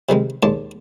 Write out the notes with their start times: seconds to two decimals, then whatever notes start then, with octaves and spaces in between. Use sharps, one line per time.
0.09 C3 D#3 G3 G#3
0.43 D#2 G#3 D5 A5 C6